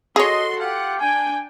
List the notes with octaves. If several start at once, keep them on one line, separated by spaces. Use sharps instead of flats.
F#4 G#4 A4 C#5 D#5 C6
F4 G4 F#5
D4 G5 G#5